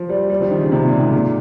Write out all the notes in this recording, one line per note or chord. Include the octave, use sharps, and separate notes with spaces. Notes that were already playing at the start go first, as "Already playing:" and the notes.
Already playing: F3
G3
G3
F3
D#3
C#3
C3
A#2
G#2
A#2